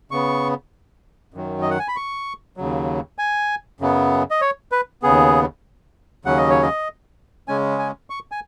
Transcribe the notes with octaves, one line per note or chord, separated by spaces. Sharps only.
C#3 B3 C#6
F#2 D#3 F#3
D#5
F#5
G#5
B5
C#6
D#2 C#3 F#3
G#5
F#2 C#3 F#3 B3
D#5
C#5
B4
D#2 C#3 B3 G#4
D#2 C#3 F#3 C#4 F#5
D#5
C#5
D#5
C#3 G#3 C#4 G#5
G#5
C#6
G#5